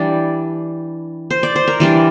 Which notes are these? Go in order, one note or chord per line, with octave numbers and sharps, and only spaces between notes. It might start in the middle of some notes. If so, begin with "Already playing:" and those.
Already playing: E3 G3 D4 D5
C5
D5
C5
A#4
E3 G3 D4